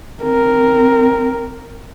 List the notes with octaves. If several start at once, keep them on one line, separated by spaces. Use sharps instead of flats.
C4 A#4